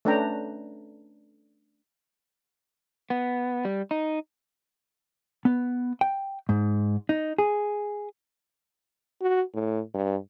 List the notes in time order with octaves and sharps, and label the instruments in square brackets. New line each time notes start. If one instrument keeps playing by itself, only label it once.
[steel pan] A3 C#4 D4 B4 G5 A#5
[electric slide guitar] B3
G3
D#4
[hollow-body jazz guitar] B3
G5
G#2
D#4
G#4
[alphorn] F#4
A2
G2